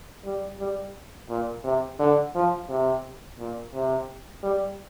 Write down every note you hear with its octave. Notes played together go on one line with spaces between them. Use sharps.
G3
G3
A#2
C3
D3
F3
C3
A#2
C3
G3